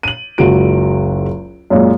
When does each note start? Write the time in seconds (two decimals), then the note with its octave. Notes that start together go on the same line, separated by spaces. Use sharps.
0.03 D#7 F#7
0.38 F#1 C#2 F#4 D7
1.70 F#2 A#2 G#3